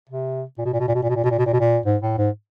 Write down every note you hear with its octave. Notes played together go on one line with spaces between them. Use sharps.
C3
A#2
B2
A#2
B2
A#2
B2
A#2
B2
A#2
B2
A#2
B2
A#2
B2
A#2
G#2
A2
G#2